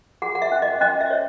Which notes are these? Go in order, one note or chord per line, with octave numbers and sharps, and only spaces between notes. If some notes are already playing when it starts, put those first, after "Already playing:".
G#4 F#5
F#5
E5
C#4
D#5
C#4 D#5
E5
C#5